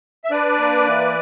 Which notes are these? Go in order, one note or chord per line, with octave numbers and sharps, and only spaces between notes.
E5
D4 B4 D5
A#3
E3